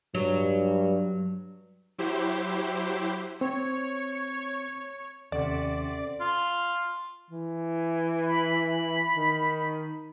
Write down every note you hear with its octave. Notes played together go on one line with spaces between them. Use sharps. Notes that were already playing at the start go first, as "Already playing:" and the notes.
G2 F#3
F#3 E4 G4 C5
C4 C#5
D#2 C3 C#4 A4 D5 F#5
F4
E3
B5
D#3